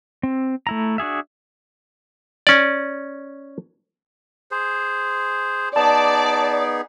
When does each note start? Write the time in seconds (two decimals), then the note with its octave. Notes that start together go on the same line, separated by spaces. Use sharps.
0.23 C4
0.67 A3 E4 A#5
0.98 D4 F#4 G#4 E5
2.47 C#4 D5
4.51 G#4 C5
5.76 B3 D#4 G#4 D5 A5